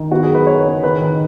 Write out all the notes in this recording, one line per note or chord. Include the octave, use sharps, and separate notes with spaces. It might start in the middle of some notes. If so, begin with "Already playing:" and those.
Already playing: D#3
B3 F#4
G#4
F#2
B4
D#4 C#5
C#3
D#3 B4
D#3